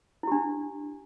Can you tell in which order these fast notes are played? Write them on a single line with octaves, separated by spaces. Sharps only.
E4 G4 D4